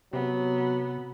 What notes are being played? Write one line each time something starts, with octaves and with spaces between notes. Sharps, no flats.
C3 F#3 B3